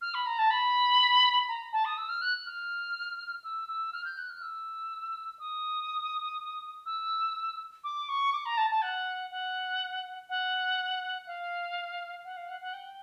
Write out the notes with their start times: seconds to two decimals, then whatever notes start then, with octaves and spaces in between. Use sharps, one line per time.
0.01 F6
0.14 B5
0.26 A#5
0.39 A5
0.50 B5
1.48 A#5
1.73 A5
1.85 D#6
1.97 E6
2.09 F6
2.22 F#6
2.46 F6
3.44 E6
3.68 E6
3.93 F6
4.05 G6
4.17 F#6
4.30 F6
4.42 E6
5.39 D#6
6.86 E6
7.84 D6
8.09 C#6
8.33 D6
8.45 A#5
8.58 A5
8.70 A5
8.82 F#5
9.31 F#5
10.29 F#5
11.27 F5
12.24 F#5
12.37 F5
12.49 F#5
12.61 F#5
12.73 G5